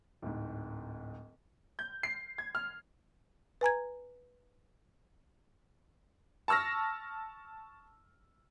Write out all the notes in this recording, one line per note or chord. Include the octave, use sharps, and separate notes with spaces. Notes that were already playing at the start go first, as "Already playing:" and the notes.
D1 G#2
G6
C7
G#6
F6
B4 G#5 A#5 G#6
A5 C#6 E6 F6 A#6